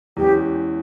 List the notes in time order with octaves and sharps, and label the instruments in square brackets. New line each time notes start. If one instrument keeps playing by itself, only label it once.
[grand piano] E2 E3 G#3 C#4 [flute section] G4